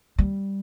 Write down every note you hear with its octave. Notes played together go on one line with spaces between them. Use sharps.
G3